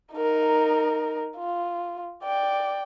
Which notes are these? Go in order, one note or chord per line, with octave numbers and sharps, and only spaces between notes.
D#4 A#4
F4
D5 G5